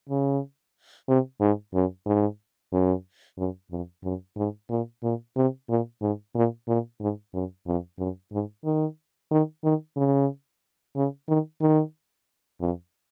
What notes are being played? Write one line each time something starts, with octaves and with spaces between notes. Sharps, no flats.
C#3
C3
G#2
F#2
G#2
F#2
F#2
F2
F#2
G#2
A#2
A#2
C3
A#2
G#2
A#2
A#2
G#2
F#2
F2
F#2
G#2
D#3
D#3
D#3
C#3
C#3
D#3
D#3
F2